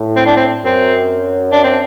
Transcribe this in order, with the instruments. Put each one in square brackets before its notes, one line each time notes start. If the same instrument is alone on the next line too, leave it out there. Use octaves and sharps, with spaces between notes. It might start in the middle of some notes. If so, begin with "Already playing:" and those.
Already playing: [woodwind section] A2
[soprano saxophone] C4
D4
C4
[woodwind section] F#2 [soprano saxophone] C4
[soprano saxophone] D4
C4